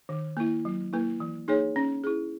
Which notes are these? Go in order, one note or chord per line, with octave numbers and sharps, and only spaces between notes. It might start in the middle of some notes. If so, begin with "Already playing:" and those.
D#3
A#3 E4
F#3
A#3 E4 B4
E3
A#3 D#4 G#4 C#5
C#4
E4 G#4